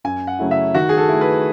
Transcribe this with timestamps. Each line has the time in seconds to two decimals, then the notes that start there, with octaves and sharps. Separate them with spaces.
0.04 F#2 G#5
0.27 F#5
0.39 C#3 F#3 A3 E4
0.51 E5
0.75 D#3 F#4
0.89 G#4
0.97 A4
1.09 A3 E4
1.21 B4